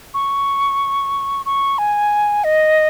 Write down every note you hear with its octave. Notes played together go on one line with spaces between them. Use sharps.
C#6
C#6
G#5
D#5